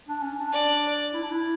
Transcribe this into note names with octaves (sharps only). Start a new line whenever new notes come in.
D4
C#4
D4
D5
E4
D4
E4